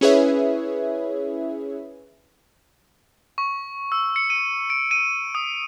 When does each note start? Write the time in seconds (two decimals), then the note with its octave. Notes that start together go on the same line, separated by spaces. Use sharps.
0.01 C#4 E4 G#4 B4 C#5 E5
3.38 C#6
3.92 E6
4.16 C#7
4.30 D#7
4.70 D7
4.91 D#7
5.35 D#6